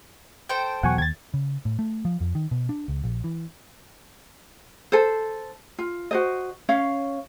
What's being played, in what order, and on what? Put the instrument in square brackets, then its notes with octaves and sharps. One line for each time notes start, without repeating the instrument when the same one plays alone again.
[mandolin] A4 C5 G5
[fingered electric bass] E2 B2 F#3 [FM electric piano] F#5 G#5 C#6
[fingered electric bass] D#2 [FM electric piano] G#6 A6
[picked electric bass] C#3
A2
A3
F3
F2
D#3
B2
D4
C#2
A#1
E3
[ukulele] A4 C5
F4
F#4 C5 D#5
C#4 C#5 F5